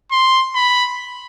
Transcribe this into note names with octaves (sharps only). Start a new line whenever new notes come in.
C6
B5